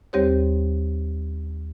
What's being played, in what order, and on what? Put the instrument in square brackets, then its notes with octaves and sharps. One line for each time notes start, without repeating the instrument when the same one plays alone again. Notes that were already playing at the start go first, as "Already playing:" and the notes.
[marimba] D#2 G3 C4 G4 C5 C#5